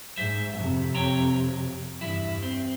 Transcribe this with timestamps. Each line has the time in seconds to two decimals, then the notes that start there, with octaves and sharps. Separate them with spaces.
0.17 G#2 C5 E5
0.58 F2 C3
0.95 C#5 G5 A#5
2.01 E2 G2 E4
2.43 C4